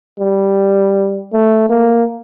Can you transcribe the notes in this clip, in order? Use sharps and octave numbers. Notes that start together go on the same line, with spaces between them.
G3
A3
A#3